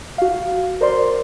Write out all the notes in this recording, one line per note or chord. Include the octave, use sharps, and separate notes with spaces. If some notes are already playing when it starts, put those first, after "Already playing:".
F#4 F5
A#4 C5 D5 C6